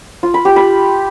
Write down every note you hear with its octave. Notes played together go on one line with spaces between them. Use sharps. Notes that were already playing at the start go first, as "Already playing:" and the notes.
F4
B5
G4
B5